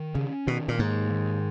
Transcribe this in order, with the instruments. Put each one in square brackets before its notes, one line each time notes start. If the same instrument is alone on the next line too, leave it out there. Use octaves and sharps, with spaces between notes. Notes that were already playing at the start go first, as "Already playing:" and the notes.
Already playing: [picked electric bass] D#3
[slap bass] C#3 [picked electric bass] C#4
[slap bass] B2 [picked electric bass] D#3
[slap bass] A#2
[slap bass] G#2 [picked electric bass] A#3
[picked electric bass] D#3